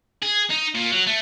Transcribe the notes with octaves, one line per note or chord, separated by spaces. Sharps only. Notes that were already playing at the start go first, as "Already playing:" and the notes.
G#4
D#4
A#2
F#3
A3